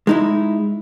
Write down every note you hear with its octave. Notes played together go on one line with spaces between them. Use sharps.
G#3 D#4 E4